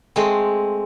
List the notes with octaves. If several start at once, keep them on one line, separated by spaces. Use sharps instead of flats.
G#3 A3 C4